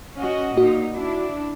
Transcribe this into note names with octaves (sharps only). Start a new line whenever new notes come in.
C#4 F#4 D#5
A#2 D#4 F#4
D4 E4